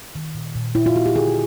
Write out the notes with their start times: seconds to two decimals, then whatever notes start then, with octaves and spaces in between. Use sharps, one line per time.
0.15 D#3
0.35 A#2
0.55 A#2
0.75 A#2 E4
0.86 F4
0.95 A#3 F#4
1.06 G4
1.15 D3 G#4